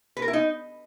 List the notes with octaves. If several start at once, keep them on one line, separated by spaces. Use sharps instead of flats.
B4
A#4
E4
D#4